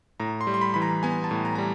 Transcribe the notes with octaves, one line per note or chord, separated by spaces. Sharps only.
A2 A#5
C6
G3
C6
B5
E3 B5
A#5
B3 G#5
A5
A2
A#5
G3 A#5